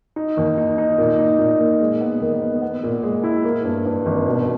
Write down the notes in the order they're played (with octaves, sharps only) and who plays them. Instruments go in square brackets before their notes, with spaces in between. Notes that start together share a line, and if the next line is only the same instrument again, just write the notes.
[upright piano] D#4
D#2
D#4
D#4
A#2
D#4
A#2
A#3
G#3
B3
D#3
B3
B3
A#2
G#3
E4
A#3
G2
G2
G#1
B2